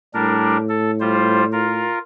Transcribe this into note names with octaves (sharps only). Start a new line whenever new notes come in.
A2 G3 D4 A#4
A4
G3 F4 C5
F4 A#4